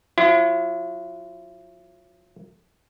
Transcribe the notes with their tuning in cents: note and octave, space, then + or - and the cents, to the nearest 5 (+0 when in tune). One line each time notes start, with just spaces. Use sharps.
F#3 -40 E4 +40